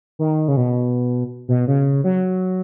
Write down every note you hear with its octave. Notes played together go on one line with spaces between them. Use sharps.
D#3
C#3
B2
B2
C#3
F#3